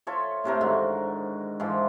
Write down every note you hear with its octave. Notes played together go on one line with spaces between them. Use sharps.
F4 A4 C#5 E5
A2 C3 A3 A#4
G#2 D3 D#3 F#4
G#2 E3 F3